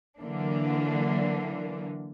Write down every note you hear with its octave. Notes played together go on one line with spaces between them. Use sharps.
D3 E3 F#3 A#3 D4